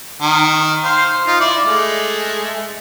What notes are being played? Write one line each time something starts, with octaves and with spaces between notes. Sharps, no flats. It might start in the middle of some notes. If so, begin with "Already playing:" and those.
D#3
C5 F5
D#4 F4
E4 D5
G#3 A3